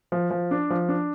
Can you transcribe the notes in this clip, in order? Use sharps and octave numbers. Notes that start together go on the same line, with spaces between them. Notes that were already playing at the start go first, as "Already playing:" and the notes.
F3
F3
D4
F3
D4